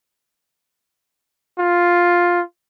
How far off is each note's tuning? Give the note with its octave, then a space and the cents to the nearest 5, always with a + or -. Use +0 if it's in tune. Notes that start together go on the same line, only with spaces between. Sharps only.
F4 +5